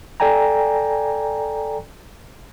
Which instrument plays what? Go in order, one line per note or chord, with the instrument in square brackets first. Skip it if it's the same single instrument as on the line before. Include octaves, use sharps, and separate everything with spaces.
[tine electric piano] A4 D5 G5 G#5 A#5